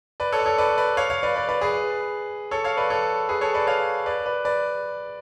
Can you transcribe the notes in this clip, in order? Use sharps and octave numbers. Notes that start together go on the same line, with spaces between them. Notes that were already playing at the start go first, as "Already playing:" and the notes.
B4 D5
A4 C#5
D5
A4 C#5
B4 D5
B4 D5
C#5 F5
C#5 F5
B4 D5
B4 D5
B4 D5
G#4 B4
A4 C#5
C#5 F5
B4 D5
A4 C#5
G#4 B4
A4 C#5
B4 D5
C#5 F5
B4 D5
B4 D5
B4 D5